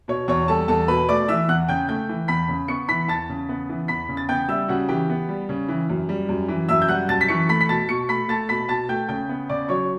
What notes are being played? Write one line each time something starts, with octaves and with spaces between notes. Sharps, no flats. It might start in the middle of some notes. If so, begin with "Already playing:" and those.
B2 C#5 C#6
E2 C#5 C#6
G3 A4 A5
E2 A4 A5
B2 B4 B5
A3 D5 D6
E3 E5 E6
E2 F#5 F#6
C#3 G5 G6
A3 G5 G6
E3
E2 B5 B6
C#3
B3 C#6 C#7
E3 B5 B6
E2 A5 A6
C#3
B3
E3
E2 B5 B6
C#3
A6
B3 G5 G6
G3 E5 E6
C#3 F#4 F#5
E3 G4 G5
B3
G3
C#3
E3
F#2
G3
F#2
E3
F#2 E5 E6
G6
G3 F#5 F#6
F#2 A5 A6
B6
E3 C#6 C#7
A3 B5 B6
B6
B2 A5 A6
B2 C#6 C#7
A3 B5 B6
A3 A5 A6
B2 B5 B6
B2 A5 A6
A3 G5 G6
C#3 G5 G6
B3
C#3 D5 D6
F#3 C#5 C#6